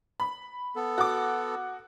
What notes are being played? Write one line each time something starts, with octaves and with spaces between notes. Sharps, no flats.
B5
B3 A4
F#4 D6